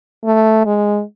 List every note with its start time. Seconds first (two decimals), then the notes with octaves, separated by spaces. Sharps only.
0.25 A3
0.66 G#3